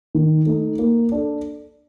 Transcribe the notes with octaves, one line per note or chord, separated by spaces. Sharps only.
D#3
A3 D#4
A#3
D4 A4